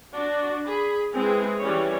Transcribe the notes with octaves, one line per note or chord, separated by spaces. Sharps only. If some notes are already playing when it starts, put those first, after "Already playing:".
D4 F#4
G#4 B5
G#3 C4 E4 G#4 B4
E3 G3 C#4 C#5